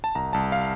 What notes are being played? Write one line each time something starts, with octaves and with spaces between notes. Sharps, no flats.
A5
C2 A#5
C2 A5
F5